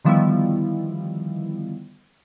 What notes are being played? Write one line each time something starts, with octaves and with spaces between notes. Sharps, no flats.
D3 D#3 F3 G3 B3 E4